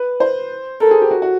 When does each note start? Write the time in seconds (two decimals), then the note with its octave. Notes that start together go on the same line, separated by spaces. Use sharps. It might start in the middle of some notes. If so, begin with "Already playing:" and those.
Already playing: B4
0.20 C5
0.80 A4 A#4
0.91 G#4
1.02 G4
1.11 F#4
1.22 F#4